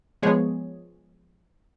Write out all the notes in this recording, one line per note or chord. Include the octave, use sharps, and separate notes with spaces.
F3 G#3 B3 G#4 C#5